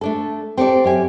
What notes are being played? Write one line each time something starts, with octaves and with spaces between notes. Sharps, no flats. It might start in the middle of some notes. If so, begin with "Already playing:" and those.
A3 D4 A4
C4 G4 A4 D5
F#2 G4 G#5